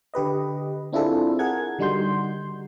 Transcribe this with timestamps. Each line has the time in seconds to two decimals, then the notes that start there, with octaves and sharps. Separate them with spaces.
0.14 D3 G4 B4 D#5
0.93 C4 D4 E4 F4 G#4 A4
1.39 G#4 A#4 F#5 G#6
1.79 D3 G3 D#4 F#4 C6 G6